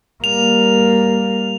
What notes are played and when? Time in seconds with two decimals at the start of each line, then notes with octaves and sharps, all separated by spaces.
0.24 G3 A#3 F7